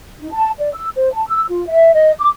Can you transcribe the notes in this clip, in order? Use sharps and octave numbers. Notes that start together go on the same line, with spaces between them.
D#4
A5
D5
E6
C5
A5
E6
F4
E5
D#5
D6